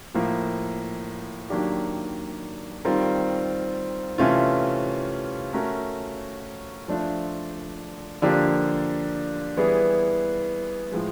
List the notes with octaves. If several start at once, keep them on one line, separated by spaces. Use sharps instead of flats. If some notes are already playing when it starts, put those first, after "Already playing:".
A2 F3 A#3
D#3 F#3 A#3 D4 G4
D#3 G3 C4 F4 A#4
C3 E3 A3 C#4 F4
A3 C#4 F#4 A#4
F3 A3 D4 F4
D3 F3 A#3 D4 G4
E3 G3 B3 E4 G#4
A2 F3 G#3